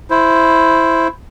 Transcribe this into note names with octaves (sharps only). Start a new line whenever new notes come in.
E4 C5